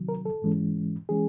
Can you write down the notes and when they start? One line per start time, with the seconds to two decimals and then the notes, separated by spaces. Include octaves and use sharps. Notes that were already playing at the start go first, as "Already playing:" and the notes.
Already playing: C3 D#3 F#3
0.09 A#4
0.26 A4
0.42 G#2 E3 G#3 C#4
1.09 E3 G#3 C#4 G#4